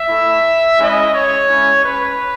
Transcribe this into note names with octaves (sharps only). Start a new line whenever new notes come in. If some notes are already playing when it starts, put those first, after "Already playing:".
Already playing: E5
A3 E4
G#3 C#4 E4 D#5
C#5
G#3 C#4 E4
B4